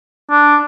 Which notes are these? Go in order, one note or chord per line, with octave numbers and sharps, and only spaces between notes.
D4